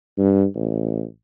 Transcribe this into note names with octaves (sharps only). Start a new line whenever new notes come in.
G2
A1